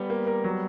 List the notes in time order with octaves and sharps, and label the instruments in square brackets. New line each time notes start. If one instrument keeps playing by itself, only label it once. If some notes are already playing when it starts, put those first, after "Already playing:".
Already playing: [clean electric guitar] G3 B3
[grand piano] A#3
A#4
F#3